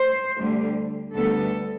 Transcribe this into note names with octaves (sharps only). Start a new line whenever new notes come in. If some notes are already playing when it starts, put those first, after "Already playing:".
Already playing: C5
D2 D3 G3
D2 D3 G3 B3 A4